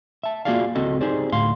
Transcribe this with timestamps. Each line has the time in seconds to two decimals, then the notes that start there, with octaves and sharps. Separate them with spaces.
0.23 E5 A5
0.45 A#3 F4 F#4 G#4 D5 F5
0.75 C#2 C4 F#4 A4 D#5
1.01 D#4 G4 G#4 C5 D5
1.32 D2 A2 F5 C6